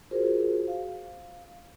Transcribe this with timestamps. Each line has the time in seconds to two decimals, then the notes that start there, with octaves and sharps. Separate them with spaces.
0.11 F4 F#4 G#4 A#4 C5
0.68 F5